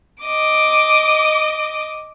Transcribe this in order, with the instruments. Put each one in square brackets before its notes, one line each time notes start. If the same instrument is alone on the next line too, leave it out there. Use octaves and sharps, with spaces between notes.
[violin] D#5 D6